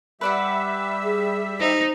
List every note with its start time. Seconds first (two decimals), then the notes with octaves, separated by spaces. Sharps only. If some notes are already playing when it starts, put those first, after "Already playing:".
0.21 G3 B4 D5 E5 F#5
1.04 G#4
1.60 D#4 C5